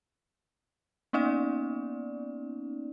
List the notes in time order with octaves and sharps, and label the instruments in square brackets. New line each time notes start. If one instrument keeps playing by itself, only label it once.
[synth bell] A#3 B3 C#4 D#4 D5